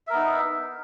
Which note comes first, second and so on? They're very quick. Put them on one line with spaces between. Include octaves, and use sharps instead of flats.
E5 A#4 B3 D#4